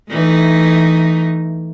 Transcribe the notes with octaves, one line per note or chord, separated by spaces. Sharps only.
E3 A3 D#4